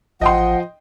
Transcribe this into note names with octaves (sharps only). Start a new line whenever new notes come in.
A1 F3 D#5 F#5 G5 C6